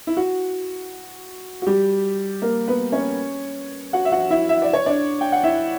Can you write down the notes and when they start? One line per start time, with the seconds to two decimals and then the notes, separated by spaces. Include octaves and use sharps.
0.07 E4
0.17 F#4
1.62 F#4
1.67 G3 G4
2.42 A#3 A#4
2.68 B3 B4
2.92 C#4 C#5
3.93 F#4 F#5
4.05 E5
4.12 F#4 F#5
4.30 E4 E5
4.49 E5
4.62 D5
4.73 C#5
4.86 D4 D5
5.21 G5
5.32 F#5
5.44 E4 E5